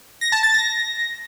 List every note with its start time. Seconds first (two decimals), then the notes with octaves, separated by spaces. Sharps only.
0.21 A#6
0.32 A5
0.43 A6
0.54 A#6